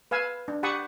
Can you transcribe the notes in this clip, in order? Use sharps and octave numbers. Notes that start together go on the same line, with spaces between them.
B4 F5 G#5 E6
D4
G4 F#5 A5 B5 C#6 D#6